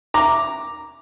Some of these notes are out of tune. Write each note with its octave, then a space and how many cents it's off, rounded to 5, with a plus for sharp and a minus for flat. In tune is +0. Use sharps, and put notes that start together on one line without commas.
A#5 +0 D6 +0